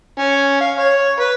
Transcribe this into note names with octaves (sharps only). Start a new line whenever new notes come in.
C#4
F5
C#5
B4